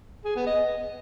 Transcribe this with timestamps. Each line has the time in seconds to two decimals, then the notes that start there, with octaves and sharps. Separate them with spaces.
0.25 G#4
0.36 B3
0.46 D#5